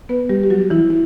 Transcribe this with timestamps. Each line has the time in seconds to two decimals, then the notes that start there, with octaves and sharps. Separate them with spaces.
0.09 B3 B4
0.29 G3 G4
0.43 G4
0.50 F#3 F#4
0.70 E3 E4
0.90 E4